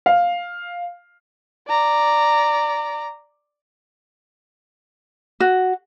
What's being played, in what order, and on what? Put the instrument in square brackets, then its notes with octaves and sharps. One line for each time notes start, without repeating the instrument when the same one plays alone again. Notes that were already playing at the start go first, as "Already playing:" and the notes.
[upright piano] F5
[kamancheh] D5 A#5
[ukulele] F#4